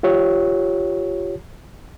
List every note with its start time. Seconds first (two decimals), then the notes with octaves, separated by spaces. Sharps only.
0.03 F4 G4 C#5